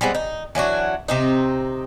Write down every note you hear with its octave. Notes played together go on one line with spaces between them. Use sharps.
G3 G#3 B3 C4
D#4
E3 F#3 D4 F#4
C3 C4 D#4